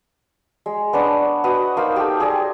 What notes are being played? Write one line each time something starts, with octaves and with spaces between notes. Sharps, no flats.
G#3
B3 D4 C#5 F#5
B3 F#4 D#5 F#5
A#3 D#4 C5 F5
G4 A4
G#4 D5 D#5